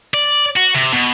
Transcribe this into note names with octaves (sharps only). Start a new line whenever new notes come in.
D5
F#4
C3
B2